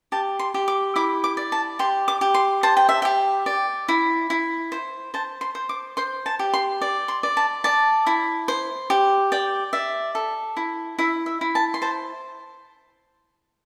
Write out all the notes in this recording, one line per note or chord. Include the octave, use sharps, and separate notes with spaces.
G4 A5
C6
G4
D6
E4 D6
D6
D5
A5
G4 C6
D6
G4
C6
C5 A5
G5
E5
G4 G5
D5
E4
E4
C5
C5 A5
C6
C5
D6
C5 C6
A5
G4
C6
D5
C6
D5
A5
D5 A5
E4
C5
G4
D5 G5
D5 E5
A4
E4
E4 E5
E5
E4
A5
C6
C5 A5